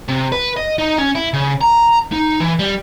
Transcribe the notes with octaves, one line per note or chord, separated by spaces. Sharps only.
C3
B4
D#5
D#4
C#4
E4
C#3
A#5
D#4
E3
G3